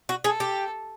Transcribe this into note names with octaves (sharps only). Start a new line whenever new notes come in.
F#4
G#4 A4
G4